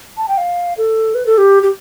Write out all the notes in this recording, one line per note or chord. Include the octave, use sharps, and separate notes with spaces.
A5
G5
F5
A4
B4
A4
G4
G4